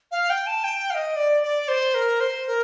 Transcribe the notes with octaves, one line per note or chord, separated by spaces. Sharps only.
F5
G5
A5
G5
F5
D#5
D5
D5
C5
A#4
C5
A#4